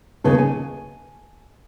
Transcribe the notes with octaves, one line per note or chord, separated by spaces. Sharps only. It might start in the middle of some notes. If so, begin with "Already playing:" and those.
D#2 C#3 B3 A4
G#5